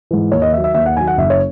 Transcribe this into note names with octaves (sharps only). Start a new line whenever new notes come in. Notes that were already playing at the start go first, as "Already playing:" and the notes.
G#2 E3
D#2 C#5
D#5
D#3 E5
F#3
E5
D#2 E5
F#5
D#3 F#3 G#5
F#5
F#1 E5
C#5